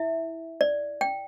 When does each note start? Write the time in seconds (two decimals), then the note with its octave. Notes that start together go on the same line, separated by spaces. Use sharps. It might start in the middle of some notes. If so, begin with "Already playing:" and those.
Already playing: E4 E5
0.61 D5
1.01 G5